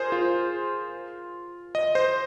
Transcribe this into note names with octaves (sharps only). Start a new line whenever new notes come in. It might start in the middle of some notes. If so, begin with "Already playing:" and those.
Already playing: F4 G#4 A#4 C5
F4
D#5
C5